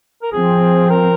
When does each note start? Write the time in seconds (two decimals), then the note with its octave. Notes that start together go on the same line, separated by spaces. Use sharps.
0.22 A#4
0.32 F3 C4 G#4
0.90 A#4